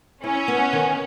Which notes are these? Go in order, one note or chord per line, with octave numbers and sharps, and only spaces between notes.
C#4 E4
B3
D#3